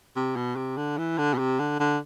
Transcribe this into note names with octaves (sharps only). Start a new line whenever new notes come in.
C3
B2
C3
D3
E3
D3
B2
C3
D3
D3